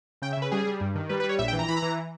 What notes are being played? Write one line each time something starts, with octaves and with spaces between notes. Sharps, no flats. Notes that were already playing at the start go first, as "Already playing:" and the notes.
C#3 G5
E5
C#3
B4
G3 G#4
G3
G2
D#3
G3 B4
B4
G3
C#5
A#1 E5
G5
E3
A#5
E3 B5
A#5
E3